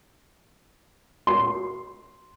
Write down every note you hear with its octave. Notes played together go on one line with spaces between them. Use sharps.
C6